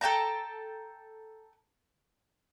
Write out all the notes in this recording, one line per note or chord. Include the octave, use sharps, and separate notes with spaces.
A4 G5 A5 A#5